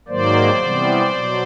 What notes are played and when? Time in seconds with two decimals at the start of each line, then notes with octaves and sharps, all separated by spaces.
0.08 G#2 D#3 F#3 A#3 C5 D5
0.60 C3 E3 G3 B3
1.13 B2 F#3